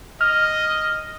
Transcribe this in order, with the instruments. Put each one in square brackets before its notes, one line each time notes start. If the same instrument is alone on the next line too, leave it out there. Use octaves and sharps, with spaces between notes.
[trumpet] D#5 [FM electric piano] F6